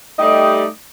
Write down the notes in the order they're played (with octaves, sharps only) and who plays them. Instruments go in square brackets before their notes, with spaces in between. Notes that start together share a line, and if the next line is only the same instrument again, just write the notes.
[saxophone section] G3 A3 D#4 G4 D5 D#5